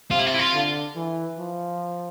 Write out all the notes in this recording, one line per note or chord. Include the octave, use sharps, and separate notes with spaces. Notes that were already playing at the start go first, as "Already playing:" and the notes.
C3 F4
E4
F4
E4
F4
D3
E3
F3